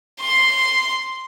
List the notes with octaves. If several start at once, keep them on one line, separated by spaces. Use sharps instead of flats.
C6